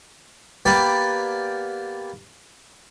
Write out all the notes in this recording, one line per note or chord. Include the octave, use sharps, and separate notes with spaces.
A#3 B3 G4 B4 D5 G5